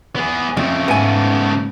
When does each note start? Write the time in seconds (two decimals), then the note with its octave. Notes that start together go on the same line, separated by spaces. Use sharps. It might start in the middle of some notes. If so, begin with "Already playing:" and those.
0.16 B3 G#4
0.57 F2 C#3 A3
0.88 G#2 B3 G#5